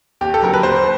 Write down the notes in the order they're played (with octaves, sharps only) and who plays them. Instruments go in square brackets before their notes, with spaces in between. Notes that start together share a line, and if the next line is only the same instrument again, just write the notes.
[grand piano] D#2 G4
A4
D3 F#3 A#4
B4
D#2 C5